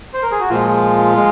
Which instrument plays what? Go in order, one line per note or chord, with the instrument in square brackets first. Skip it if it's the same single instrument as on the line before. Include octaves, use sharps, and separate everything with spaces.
[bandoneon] C5
A#4
G#4
F#4
A#2 F3 G#3 F4
G#3